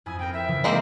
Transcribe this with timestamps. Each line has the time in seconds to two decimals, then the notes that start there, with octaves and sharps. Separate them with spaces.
0.06 F2 E4 G#5 D#6
0.19 C4 A#4 G5
0.33 E5
0.48 C#3 E3 F3
0.64 G#3 A#3 C4